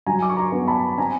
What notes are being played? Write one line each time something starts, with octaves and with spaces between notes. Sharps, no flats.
F#3 G#5 A#5
D6
C#6
A#5 C6
B3
A5 B5
C4 G#5 A#5